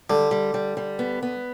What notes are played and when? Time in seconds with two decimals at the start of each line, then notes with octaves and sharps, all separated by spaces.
0.09 D3 G3
0.31 G3
0.54 G3
0.77 G3
0.99 B3
1.22 B3